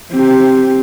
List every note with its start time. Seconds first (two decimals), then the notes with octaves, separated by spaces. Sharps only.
0.13 C4 G4